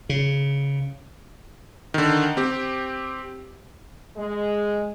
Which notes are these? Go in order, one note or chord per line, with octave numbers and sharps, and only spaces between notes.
C#3
D3 D#3
C4 G4
G#3